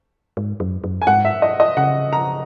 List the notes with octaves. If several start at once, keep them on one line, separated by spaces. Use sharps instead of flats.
G#2
F#2
F#2
G#5
G#2 F#5
E5
D#5
D#5
C#3 F#5
A#5